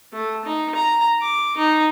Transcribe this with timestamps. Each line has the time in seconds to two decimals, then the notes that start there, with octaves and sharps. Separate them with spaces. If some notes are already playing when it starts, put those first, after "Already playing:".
0.13 A3
0.45 D#4
0.75 A#5
1.22 D6
1.57 D#4